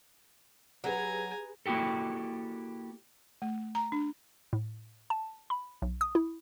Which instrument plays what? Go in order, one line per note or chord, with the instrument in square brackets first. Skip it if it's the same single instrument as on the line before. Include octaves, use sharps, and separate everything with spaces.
[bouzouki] F#3 [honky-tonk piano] G4 G#4 B4 [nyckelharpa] G#5 A#5
[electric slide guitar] A#3 E4 F#4 G4 A4
[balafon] A3
A#5
D4
[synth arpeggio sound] A2
A5
B5
B1
D#6
E4